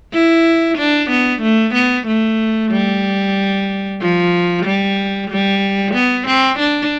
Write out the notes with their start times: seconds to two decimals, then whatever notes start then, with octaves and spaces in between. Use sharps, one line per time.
0.13 E4
0.78 D4
1.10 B3
1.42 A3
1.75 B3
2.07 A3
2.72 G3
4.01 F3
4.66 G3
5.30 G3
5.95 B3
6.27 C4
6.59 D4